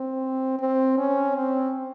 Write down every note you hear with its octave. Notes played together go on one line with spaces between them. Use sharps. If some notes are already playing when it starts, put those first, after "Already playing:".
Already playing: C4
C4
C#4
C4